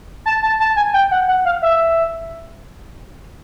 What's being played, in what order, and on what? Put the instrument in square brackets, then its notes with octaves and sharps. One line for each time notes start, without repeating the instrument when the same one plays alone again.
[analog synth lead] A5
A5
A5
G#5
G5
F#5
F#5
F5
E5